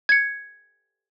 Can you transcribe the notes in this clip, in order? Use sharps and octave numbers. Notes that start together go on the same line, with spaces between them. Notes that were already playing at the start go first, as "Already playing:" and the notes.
G#6 C#7